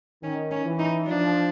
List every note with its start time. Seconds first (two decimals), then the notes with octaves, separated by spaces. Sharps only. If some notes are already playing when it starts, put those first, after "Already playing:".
0.23 D#3 C#4
0.51 C#4
0.65 E3
0.79 D#4
1.07 F3 D4